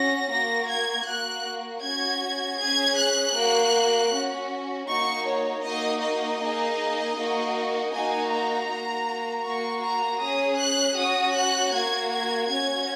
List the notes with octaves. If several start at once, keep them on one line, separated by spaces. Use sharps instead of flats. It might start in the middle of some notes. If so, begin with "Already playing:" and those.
Already playing: C#4 F#4 A#6
A#3 F#4 A#6
G#6
A#3 F#4 F#6
C#4 F#4 G#6
C#4 G#4 G#6
F#6
A#3 F#4
C#4 F#4
A#3 D#4 F#4 C#6
C#5
A#3 D#4 F#4 D#5
D#5
A#3 D#4 G#4
A#3 D#4 F#4
A#3 D#4 F#4 G#5
A#5
A#3 F#4
A#3 F#4 C#6
A#5
C#4 G#4 D#6
F#6
C#4 F#4 D#6
F#6
A#3 F#4 G#6
G#6
C#4 F#4 G#6